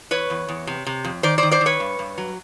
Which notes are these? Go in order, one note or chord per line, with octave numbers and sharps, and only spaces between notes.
E2 B4 C#5
E2
E2
C3
C3
F2
D#3 C5 D5
D#3 C5 D5
C5 D5
D#3
B4 C#5
G2
G2
F#3